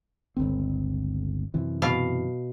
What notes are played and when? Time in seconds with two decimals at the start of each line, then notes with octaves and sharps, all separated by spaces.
0.37 G1 C#2 C4
1.54 F#2 C3 E3
1.82 B2 F5